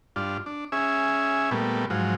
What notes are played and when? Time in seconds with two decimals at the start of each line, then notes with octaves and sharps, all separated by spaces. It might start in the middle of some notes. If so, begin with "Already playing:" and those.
0.16 G2 D4 F4
0.46 D4
0.72 C#4 G#4 E5
1.51 A#2 G3 A3 B3
1.90 G#2 F3 F#3